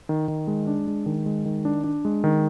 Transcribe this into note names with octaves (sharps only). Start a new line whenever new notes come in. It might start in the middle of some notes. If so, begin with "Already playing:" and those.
D#3
D#3
G#3
D4
G#3
D#3
G#3
D#3
D4
D4
G#3
D#3